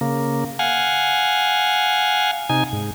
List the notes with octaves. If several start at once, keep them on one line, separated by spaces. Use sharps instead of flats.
C#3 A#3
F5 F#5 G#5
C3 D#4 G#5
G#2